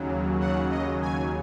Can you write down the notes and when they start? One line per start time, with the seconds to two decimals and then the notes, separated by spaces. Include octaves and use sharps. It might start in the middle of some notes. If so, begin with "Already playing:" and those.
Already playing: D#2 C#3 F#3
0.40 D#2 C#3 F#3 F#5
0.70 D#5
1.02 G#5